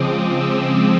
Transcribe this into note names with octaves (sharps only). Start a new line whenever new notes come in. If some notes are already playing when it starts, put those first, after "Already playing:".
Already playing: C#3 F3 G#3 C4 D6 D#6
E6